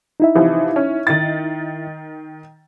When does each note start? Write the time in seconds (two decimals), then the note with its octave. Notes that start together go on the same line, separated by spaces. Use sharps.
0.20 D#4 E4 E5
0.35 C3 E3 F3
0.76 C#4
1.07 D#3 A6